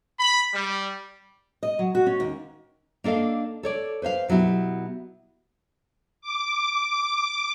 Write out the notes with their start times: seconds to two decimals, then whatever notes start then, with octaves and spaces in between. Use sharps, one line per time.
0.19 B5
0.54 G3
1.63 D#5
1.79 F#3
1.95 F#4
2.07 C#4
2.20 D#2
3.04 A#3 D4 A4 D#5 F5
3.63 A4 C#5 D5
4.02 B4 C5 E5 F5
4.28 B2 F#3 B3 E4 G4
6.21 D6